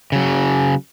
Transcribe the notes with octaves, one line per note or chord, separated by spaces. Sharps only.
C#3 F#3